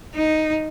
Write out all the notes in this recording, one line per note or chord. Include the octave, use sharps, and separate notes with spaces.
D#4